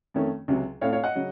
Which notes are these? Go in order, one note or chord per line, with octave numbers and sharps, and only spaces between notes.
F2 D#3 A3 C#4
C#2 C3 F#3
A2 A3 C4 C#5 F5
C#5 F5
D#5 F#5
C#3 F#3